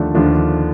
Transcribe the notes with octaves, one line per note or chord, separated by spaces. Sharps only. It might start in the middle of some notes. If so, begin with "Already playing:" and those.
Already playing: D#2 D3 F3 A3 D4
D#2 D3 F3 A3 D4